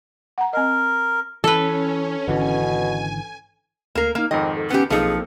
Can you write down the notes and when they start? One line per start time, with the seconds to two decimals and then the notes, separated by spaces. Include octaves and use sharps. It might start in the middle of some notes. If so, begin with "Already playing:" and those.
0.38 F#5 A#5
0.53 C4 A#4 D#5
1.44 E3 C#4 A4 B4
2.28 G#1 B2 D3 E3 G#5
3.95 D2 A#3 A#4 C7
4.15 A#3 D#4 F6
4.31 F2 G#2 D#3 D#5 G5
4.57 A4
4.70 B3 C#4 G4 C#7
4.90 B1 F3 A#3 C4 D#4 G#4 A4 C#7